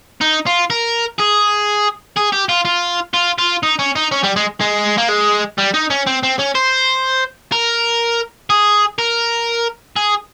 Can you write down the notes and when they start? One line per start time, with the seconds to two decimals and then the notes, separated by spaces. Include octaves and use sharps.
0.21 D#4
0.47 F4
0.70 A#4
1.19 G#4
2.16 G#4
2.32 G4
2.49 F4
2.65 F4
3.14 F4
3.38 F4
3.63 D#4
3.79 C#4
3.96 D#4
4.11 C#4
4.23 G3
4.36 G#3
4.61 G#3
4.98 A#3
5.09 G#3
5.58 G3
5.74 D#4
5.90 C#4
6.07 C4
6.23 C4
6.39 C#4
6.55 C5
7.52 A#4
8.50 G#4
8.98 A#4
9.96 G#4